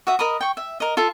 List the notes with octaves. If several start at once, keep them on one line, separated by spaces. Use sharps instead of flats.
F#4 E5 D#6
A#4 D#5 B5 D#6
G5 C#6
E5
A#4 D#5
F4 A4 E5